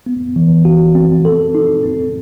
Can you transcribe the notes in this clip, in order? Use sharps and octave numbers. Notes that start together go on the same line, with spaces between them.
B3
E3
F#4
C4
A4
D#4
C4